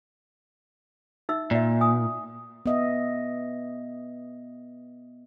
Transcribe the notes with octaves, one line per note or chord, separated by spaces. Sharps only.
D#4 E5 E6
A#2 D5 E5
G#5 D#6
B3 D#5 E5